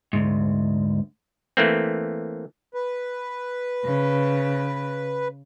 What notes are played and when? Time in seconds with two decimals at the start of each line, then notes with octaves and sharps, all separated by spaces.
0.13 D2 G#2
1.57 E3 A3 A#3 C4
2.74 B4
3.84 C#3